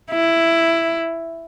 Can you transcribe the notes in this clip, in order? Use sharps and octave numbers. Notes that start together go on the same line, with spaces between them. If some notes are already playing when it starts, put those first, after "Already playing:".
E4